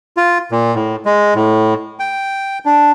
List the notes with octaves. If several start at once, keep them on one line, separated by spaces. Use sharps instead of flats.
F4
A#2
A2
G#3
A2
G5
D4